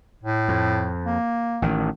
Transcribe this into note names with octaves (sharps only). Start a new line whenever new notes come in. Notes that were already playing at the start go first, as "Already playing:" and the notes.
A2
F2
A#3
A1 D#3